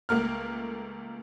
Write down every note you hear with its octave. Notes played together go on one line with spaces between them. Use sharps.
C#2 A3 A#3 F6